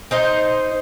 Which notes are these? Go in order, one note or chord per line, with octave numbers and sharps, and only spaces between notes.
D#4 C5 D#5